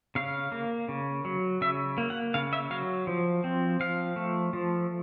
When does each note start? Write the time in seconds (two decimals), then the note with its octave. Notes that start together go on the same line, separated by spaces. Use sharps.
0.15 C#3 F5
0.52 A#3
0.89 C#3
1.25 F#3
1.61 C#3 E5
1.98 A#3
2.10 F#5
2.34 C#3 F5
2.53 E5
2.70 F#3 F5
3.07 F3
3.44 C4
3.80 F3 F5
4.16 A3
4.53 F3